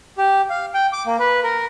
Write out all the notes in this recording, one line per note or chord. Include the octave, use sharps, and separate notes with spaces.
G4
F5
G5
D6
A#3
B4
A#4